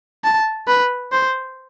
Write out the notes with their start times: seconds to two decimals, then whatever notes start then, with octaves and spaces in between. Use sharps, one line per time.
0.24 A5
0.68 B4
1.12 C5